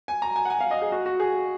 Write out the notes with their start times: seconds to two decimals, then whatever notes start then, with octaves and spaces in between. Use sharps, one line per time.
0.08 G#5
0.22 A#5
0.36 G#5
0.45 F#5
0.50 G#5
0.61 F5
0.71 D#5
0.82 G#4
0.92 F#4
1.06 F#4
1.20 G#4